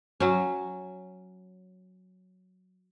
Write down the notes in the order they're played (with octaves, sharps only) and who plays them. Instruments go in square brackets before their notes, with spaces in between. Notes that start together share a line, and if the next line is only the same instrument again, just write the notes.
[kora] F#3 C#4